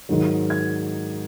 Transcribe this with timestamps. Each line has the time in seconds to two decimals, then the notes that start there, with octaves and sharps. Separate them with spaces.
0.09 G#2 D#3 F#3
0.50 G#6